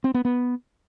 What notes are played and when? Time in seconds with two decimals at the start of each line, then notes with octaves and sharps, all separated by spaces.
0.04 C4
0.14 B3
0.25 B3